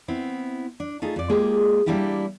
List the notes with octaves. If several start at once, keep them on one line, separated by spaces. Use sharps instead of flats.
B3 C4 E4
D4
A3 D#4 F4 G#4
F2 D5
G#3 A#3 F4 G4 G#4
G3 A#3 D4 E4 F4 G4